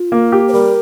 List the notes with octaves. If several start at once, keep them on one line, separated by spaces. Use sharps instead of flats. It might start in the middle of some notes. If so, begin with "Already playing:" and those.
Already playing: F4
A#3
G4
C5
G3 A#4